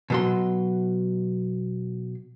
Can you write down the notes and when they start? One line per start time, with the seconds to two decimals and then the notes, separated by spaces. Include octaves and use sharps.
0.10 B2 F#3 C6